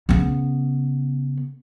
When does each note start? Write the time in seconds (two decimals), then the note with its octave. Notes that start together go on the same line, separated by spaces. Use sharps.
0.09 C#3 B3